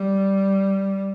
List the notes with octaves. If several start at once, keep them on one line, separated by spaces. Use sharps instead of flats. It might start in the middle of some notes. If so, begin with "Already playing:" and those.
Already playing: G3